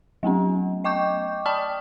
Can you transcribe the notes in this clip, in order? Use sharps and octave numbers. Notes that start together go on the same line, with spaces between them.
F#3 A3 B3 C#4
D#5 G5 C#6 D6 G6
D5 G5 A5 B5 D#6 F6